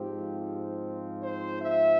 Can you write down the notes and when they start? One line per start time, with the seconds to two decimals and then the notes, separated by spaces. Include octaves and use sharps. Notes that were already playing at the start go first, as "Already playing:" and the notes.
Already playing: G#2 F3 C4 F4 G4
1.22 C5
1.60 E5